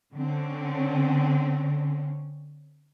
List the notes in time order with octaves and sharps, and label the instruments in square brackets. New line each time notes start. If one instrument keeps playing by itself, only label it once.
[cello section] D3 C4 C#4